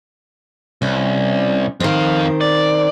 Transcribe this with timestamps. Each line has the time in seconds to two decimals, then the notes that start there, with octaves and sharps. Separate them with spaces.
0.82 C2 C#4
1.80 F2 D#3 C4 F5
2.41 D5